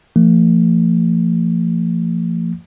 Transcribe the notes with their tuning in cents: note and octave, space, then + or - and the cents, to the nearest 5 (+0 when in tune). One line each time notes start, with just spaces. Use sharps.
F3 -30 A3 +45